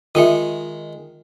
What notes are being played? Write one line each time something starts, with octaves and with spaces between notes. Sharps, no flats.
D#3 G#3 F4 E5